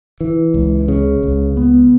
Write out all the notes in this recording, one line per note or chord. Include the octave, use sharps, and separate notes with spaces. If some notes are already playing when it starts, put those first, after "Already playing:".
E3
C#2
C#3
C#2
B3